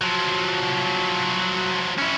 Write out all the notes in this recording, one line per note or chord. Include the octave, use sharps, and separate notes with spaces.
F3 F#3
C#4 E4